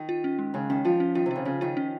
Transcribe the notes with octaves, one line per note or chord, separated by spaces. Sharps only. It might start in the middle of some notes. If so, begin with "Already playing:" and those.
Already playing: D#3
F4
C#4
G#3
C#3 G#3
D#3 C#4
F3 F4
C#4
D#3 F4
C3
C#3 F4
C#3 C#4
D#3 F4
C#4